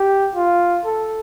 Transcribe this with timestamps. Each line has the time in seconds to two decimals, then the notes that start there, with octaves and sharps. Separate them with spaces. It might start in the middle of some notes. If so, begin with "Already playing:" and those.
Already playing: G4
0.35 F4
0.85 A4